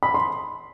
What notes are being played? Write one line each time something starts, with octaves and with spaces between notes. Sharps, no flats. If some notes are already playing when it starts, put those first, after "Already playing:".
B5
C6